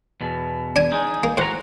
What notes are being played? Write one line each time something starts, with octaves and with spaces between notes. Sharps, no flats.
E2 B2
D4 G#5
G#3 D#4
A#3
A2 F#4 C5 F#5 A#5